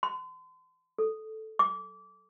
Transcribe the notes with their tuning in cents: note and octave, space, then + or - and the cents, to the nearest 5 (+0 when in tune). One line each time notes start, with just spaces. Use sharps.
C6 -40
A4 -5
D6 -25